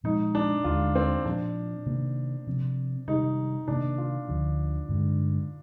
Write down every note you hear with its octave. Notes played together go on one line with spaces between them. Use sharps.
A#2 F3 G#3 C4 D#4
D4
D#2 D3 G#3 D4 F4
C4
A#2 F3 C4 D4
C3 D#3 A#3
C3 F3 C4
C3 D#3 G3 D#4
C3 D#3 A#3 D4
F4
D2 D3 F3
G2 D3 G#3 D4